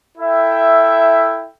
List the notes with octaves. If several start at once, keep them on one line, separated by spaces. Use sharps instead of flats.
E4 A4 E5 G5